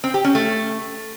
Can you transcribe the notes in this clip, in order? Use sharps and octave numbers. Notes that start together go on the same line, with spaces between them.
C4
G4
C#4
A3